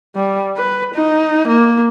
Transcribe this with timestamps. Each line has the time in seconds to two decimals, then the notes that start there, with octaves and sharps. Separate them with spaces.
0.16 G3
0.57 B4
0.95 D#4
1.48 A#3